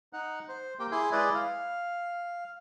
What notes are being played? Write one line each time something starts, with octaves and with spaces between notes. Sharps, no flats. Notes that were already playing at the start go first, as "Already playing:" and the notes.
D#4 F#5
C5
A#3 G4 G5
E4 G#4 C6
G#3 E4 B4 D5 D#5
F5